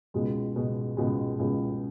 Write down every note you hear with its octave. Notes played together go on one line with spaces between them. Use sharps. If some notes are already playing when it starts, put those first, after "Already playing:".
C#2 B2 G#3
C#2 B2 G#3
C#2 B2 G#3
C#2 B2 G#3